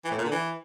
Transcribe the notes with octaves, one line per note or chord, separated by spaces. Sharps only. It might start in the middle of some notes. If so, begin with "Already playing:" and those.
E3
A2
A#2
D3
E3